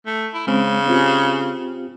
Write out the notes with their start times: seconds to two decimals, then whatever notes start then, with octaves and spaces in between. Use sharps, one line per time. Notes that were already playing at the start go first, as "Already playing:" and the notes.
0.06 A3
0.34 E4
0.47 C#3 G#3 C4 C#4
0.88 C4 F4 G4